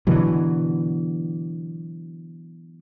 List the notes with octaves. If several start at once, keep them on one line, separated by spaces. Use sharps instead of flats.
B2 D3 E3 F#3